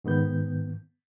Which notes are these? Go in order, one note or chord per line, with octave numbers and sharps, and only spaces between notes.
G#2 D#3 B3 G6